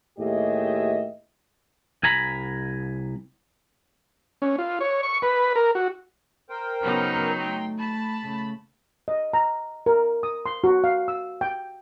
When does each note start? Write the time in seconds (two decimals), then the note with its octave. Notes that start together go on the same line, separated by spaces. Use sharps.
0.18 D#2 A2 G4 G#4 D#5 E5
2.03 C2 G#5 A#5 B5
4.42 C#4
4.59 F4
4.81 C#5
5.03 C#6
5.22 B4
5.56 A#4
5.75 F#4
6.50 A#4 C5 G5
6.82 C#3 F#3 B3 D#4
7.41 A3 G5 C6
7.78 A5 B5
8.22 C#3 A3
9.08 D#5
9.33 A#5
9.86 A#4
10.23 D#6
10.46 C6
10.64 F#4
10.84 F5
11.08 E6
11.41 G5